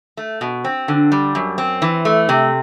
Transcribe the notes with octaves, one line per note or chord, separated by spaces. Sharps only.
A3
B2
C4
D3
G3
F#2
C4
E3
A3
C3